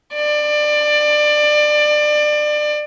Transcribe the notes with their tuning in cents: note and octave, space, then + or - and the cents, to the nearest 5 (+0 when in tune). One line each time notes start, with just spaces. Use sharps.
D5 +25